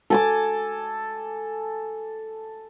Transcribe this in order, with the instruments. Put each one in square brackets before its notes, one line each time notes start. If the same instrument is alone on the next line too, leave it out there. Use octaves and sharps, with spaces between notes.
[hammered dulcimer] A4 G#5 D6